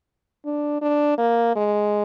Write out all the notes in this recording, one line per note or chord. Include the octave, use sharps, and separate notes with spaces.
D4
D4
A#3
G#3